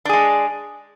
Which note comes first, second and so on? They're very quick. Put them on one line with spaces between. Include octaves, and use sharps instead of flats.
D4 G#4 G#3